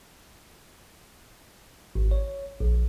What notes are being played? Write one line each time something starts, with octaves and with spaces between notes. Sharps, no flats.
G#1
C#5
A#1